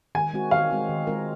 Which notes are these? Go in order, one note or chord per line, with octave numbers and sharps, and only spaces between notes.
D#3 G#5
G#3 C4 F#4
D#3 F5
G#3 C4 F#4
D#3
G#3 C4 F4 A#4